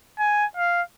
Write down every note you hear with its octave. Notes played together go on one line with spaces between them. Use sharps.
G#5
F5